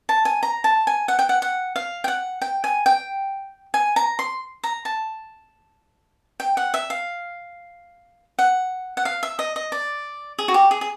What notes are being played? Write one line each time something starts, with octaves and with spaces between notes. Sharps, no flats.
A5
G#5
A#5
A5
G#5
F#5
G5
F#5
F#5
F5
G5
F#5
G5
G#5
G5
G#5
A#5
C6
A#5
A5
G5
F#5
E5
F5
F#5
F#5
F5
E5
D#5
D#5
D5
G#4
F#4
G4
G#4
G#4